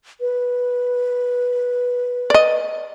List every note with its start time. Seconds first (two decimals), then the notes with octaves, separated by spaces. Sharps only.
0.20 B4
2.30 D5 D#5